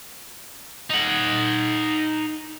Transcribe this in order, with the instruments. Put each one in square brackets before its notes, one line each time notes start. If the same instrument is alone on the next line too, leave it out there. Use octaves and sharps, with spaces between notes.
[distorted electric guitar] D#4 F#5